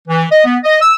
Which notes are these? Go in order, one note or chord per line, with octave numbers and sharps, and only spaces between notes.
E3
D#5
B3
D#5
E6